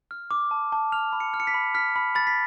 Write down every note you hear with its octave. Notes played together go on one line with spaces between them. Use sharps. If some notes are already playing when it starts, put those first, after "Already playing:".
F6
D6
A5
A5
F6 F7
B5
C#7
F6
C#7
B6
B5
F6 B6
B5
B5 A6
B6